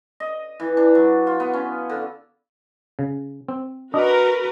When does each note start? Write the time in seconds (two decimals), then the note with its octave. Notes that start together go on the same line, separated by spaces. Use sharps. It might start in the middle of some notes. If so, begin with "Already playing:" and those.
0.20 D#5
0.60 E3
0.77 D4
0.95 F#3
1.27 F4
1.40 B3
1.53 C#4
1.89 D3
2.99 C#3
3.49 C4
3.94 D4 F#4 A#4 B4 D#5